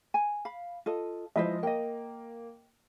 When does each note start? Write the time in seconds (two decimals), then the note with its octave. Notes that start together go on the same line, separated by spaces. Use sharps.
0.14 G#5
0.45 F5 B5
0.86 F4 A4 D#5
1.36 F3 G#3 E4 B4 C5 D#5
1.63 A#3 D#5 G5